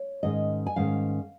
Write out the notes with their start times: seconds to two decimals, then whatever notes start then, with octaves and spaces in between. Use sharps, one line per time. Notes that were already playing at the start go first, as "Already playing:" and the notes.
Already playing: C#5
0.23 G#2 D#3 C#4 D#5
0.66 G#5
0.76 G#2 D#3 C#4 F5